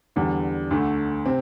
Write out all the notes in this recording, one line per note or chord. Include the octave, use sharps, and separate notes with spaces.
E2 D3 G3 D4
D2 D3 A3
C3 C4